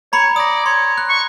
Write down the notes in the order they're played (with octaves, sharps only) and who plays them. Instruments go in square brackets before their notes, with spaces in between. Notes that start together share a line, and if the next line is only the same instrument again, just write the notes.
[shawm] C#5 [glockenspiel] A#5 B5 C#7
[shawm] D5 [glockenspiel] D#6 A#6
[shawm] C#5 [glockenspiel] C6
[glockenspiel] F#6
[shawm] C#6